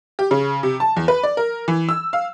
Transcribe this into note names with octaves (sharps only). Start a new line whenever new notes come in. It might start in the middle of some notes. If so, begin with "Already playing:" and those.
G4
C#3
C3
A5
E2
B4
D5
A#4
E3
E6
F5